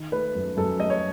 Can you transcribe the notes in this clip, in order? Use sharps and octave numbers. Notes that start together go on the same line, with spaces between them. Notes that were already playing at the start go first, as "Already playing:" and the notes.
Already playing: D#3
A3 B4
F#2
F#2 A4
A3 D#5
C#5